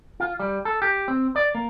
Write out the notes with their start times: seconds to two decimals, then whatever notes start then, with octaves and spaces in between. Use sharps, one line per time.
0.20 F4
0.40 G3
0.65 A4
0.82 G4
1.08 C4
1.36 D5
1.55 A#3